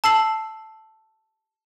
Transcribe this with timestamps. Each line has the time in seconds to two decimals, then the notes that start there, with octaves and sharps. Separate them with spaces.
0.04 A5 E6 C7 F#7